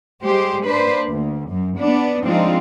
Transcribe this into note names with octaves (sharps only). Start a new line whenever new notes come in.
G3 G#3 G4 C5
A#3 D4 B4 C5
D2
F#2
B3 D4
F3 G#3 C4 D4 D#4 F4